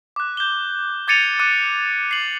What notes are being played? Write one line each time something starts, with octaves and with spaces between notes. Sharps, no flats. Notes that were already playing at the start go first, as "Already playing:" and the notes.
D6 F#6
G6 G7
D6 G#6 A6 C#7 D#7 F7
D6 F#6 D#7
C7 F#7